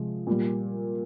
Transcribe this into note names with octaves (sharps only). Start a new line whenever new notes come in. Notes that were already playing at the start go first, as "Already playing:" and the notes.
Already playing: C3 F3 G#3
A#2 G3